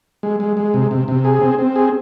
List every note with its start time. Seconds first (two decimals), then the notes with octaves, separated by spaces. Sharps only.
0.23 G#3
0.40 G#3
0.57 G#3
0.74 C3
0.91 C3
1.08 C3
1.25 G#4
1.41 C4
1.59 C4
1.76 G#4